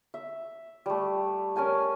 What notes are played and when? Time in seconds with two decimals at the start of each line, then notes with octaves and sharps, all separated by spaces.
0.14 E5
0.86 G3 A3
1.56 C#4 A#4 G#5 A5